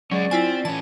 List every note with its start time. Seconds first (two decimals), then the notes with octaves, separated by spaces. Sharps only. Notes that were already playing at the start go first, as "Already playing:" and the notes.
0.11 F#3 G#3 C#4 D5
0.31 C4 E4 F4 G#5
0.65 E3 C#4 A5